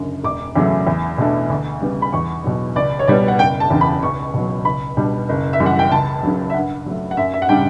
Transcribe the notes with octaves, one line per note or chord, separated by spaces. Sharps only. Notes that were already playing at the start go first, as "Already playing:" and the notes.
Already playing: F#1 F#2 D3
E1 D6
E2 C#3 F#3 A3
E2
B2 A3 D4
D2
C#3 G3 B3
B5
E2 C#6
B2 F#3
C#2 D5
C#5
B2 G3 B3 D5
F#5
F#1 G5
A5
E2 C#3
B5
C#2 C#6
B2 F#3
C#2 B5
B2 G3 D4
F#1
E5
F#2 E3 G3
F#5
G5
C#2 A5
C#3 F#3
E5
G2 F#5
F#3 A3
F#5
F#2 E5
E5
F#5
C#3 G3 D4 G5